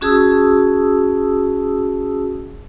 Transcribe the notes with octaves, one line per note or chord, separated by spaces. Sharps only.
C#4 F#4 G#4 A5 D#6 E6